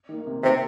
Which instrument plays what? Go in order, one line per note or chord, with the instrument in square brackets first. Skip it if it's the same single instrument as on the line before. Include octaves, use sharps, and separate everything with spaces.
[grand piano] D#3 A#3
C3
[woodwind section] C3 [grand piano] D#3 A#3